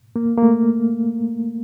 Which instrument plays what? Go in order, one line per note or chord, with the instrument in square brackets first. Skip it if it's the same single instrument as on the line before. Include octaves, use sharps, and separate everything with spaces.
[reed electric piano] A#3
A#3
A3